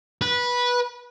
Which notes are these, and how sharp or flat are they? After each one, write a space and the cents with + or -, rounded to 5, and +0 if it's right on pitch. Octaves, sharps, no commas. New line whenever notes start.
B4 -15